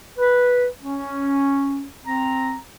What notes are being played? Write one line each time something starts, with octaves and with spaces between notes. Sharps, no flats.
B4
C#4
C4 A#5